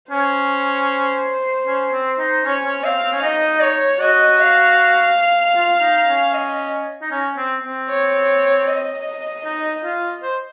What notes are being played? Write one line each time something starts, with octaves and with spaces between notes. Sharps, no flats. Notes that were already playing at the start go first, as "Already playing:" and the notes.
C#4 C5
C#4
C4
D#4
C#4 C#5
C#4
C4 F5
C4
C#4
D#4 D#5
C#5
F#4 D#5
F5
F4
D#4
C#4
D#5
D#4
C#4
C4
C4
C#5
D#5
D#4
F4
C5